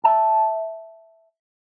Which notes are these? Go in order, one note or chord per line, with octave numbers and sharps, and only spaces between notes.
E5 A5